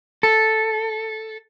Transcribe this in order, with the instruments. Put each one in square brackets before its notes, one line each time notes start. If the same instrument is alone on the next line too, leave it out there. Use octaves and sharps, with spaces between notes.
[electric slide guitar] A4